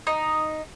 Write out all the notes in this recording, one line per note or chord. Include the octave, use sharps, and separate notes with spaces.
D#4